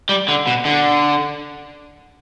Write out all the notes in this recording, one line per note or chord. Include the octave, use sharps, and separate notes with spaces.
G3
D3
B2
D3